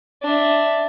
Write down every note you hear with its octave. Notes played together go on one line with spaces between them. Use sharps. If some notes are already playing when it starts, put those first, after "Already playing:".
D4 E5